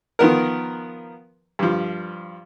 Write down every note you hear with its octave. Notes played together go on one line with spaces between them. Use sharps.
D#3 F3 B3 A#4
G2 F3